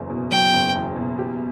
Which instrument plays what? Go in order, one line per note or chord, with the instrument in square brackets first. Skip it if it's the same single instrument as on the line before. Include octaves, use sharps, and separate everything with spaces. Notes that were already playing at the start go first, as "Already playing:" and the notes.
Already playing: [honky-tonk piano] F#1 E2 F#3
B2
[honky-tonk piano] F#3 [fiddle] G5
[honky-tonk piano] F#1
E2
B2
G4